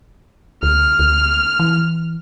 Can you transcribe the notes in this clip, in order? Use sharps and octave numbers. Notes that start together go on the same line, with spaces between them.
D2 F6
D2
E3